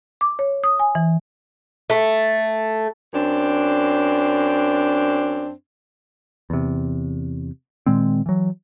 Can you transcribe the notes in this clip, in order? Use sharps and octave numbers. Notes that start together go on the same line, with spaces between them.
D6
C#5
D#6
G#5
E3
A3
F#2 C4 D4
E2 C3
A#2 D#3 G#3 C4
E3 F#3